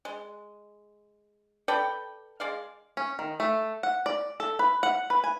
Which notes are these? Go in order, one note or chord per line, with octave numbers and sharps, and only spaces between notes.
G#3
A4 B4 D5 G5
G#3 D5 F5
C#4
D#3
A3
F#5
D5
A4
B4
F#5
B4
G#5